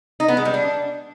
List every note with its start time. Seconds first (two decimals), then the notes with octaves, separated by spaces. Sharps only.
0.20 D#4
0.28 B3
0.37 G#3
0.45 G3
0.54 D4